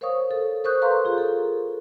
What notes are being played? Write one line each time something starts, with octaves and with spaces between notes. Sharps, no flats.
A#4 C5 C#5 F5 C#6 D#6
A4
A#4 C5 C#6 D#6 F#6 G6
A4 B4 F5 A#5 C6 C#6
F4 G#4
A4 A#4